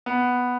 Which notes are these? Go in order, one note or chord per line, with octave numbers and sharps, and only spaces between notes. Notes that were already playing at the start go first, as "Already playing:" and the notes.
B3